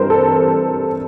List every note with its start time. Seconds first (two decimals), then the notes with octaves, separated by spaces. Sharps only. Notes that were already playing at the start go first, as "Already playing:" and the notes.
Already playing: G2 E3 G3 C4 A#4 C5
0.10 A4